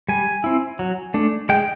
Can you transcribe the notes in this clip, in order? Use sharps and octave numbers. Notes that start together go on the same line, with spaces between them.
G3 G#5
C4 E4
F#3
A3 D4
G#3 G5